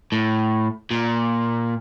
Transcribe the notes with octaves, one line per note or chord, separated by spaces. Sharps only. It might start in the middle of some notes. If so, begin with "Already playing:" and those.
A2
A#2